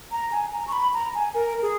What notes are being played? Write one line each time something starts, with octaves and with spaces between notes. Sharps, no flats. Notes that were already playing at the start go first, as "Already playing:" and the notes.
A#5
G#5
A#5
C#6
B5
A#5
G#5
A#4
G#4